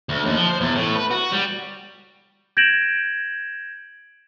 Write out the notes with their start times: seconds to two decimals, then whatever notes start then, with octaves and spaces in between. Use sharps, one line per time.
0.09 D2
0.25 D#2
0.37 F3
0.49 C5
0.61 E2
0.75 A2
0.95 B4
1.11 F#4
1.32 G3
2.57 G6 G#6 A#6 D7 E7 F#7